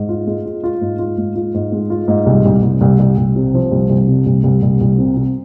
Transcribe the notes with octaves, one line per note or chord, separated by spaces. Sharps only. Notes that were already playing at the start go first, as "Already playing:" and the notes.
Already playing: G#2
F4
G#3
F4
F4
G#2
F4
G#2
F4
G#2
G#3
F4
G#2
C2
C2
C2
C2
C2
C2
C3
F3
C2
C2
C3
C2
C2
C2
C2
C3
C3